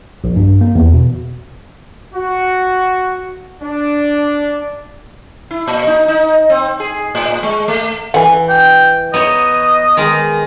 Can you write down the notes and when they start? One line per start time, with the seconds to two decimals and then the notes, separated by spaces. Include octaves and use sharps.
0.24 A#1
0.36 G2
0.61 A#3
0.75 E2
0.94 B2
2.14 F#4
3.62 D4
5.51 E4
5.68 A#2
5.87 D#4
6.08 D#4
6.50 C4
6.80 G#4
7.15 A2
7.43 G#3
7.68 A3
8.14 E3 F#5 G#5
8.49 G5
9.14 B3 D#4 C#5 D#5
9.97 D#3 G#3 A#4